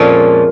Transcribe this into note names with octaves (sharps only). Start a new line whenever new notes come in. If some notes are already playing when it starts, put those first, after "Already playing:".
Already playing: F2 A#2 F3 G#3 C#4